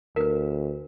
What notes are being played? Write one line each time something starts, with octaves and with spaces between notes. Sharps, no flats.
D2 A#4 B4